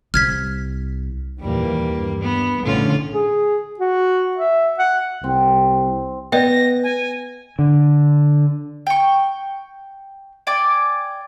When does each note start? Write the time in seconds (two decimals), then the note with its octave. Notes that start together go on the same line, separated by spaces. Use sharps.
0.14 C2 F6 G#6 B6
1.41 D#2 A#2 E3 G3 A#3
1.90 G2
2.22 B3
2.66 A#1 A2 D3 C#4 F4
3.14 G#4
3.79 F#4
4.37 E5
4.79 F#5
5.24 C2 C4
6.32 B3 D5 D#5 G5 A#6
6.83 G#5
7.59 D3
8.87 G5 C#6
10.47 D5 G5 G#5 D6